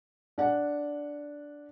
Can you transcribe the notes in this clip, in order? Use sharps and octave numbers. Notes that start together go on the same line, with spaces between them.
D4 F#5